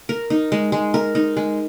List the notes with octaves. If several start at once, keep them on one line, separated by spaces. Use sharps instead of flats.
A#4
D#4
G#3
G#3
A#4
D#4
G#3